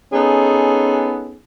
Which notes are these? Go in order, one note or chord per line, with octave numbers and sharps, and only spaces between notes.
B3 C#4 D#4 G#4 A4